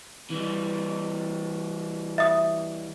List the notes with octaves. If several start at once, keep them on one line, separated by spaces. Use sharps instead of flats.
E3 G3
E5 D#6